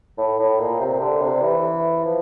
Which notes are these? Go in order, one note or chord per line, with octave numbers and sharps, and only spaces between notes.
A2
A2
A#2
C3
D3
C3
E3
F3